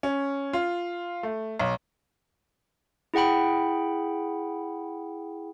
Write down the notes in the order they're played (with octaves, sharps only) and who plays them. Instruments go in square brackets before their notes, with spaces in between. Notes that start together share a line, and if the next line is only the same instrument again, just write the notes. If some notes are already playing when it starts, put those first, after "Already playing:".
[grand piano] C#4
F4
A3
B1
[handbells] E4 G#4 F#5 G5 B5